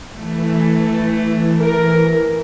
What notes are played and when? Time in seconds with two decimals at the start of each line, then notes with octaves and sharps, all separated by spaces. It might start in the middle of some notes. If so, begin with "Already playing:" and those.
0.17 E3 A3
1.61 A#4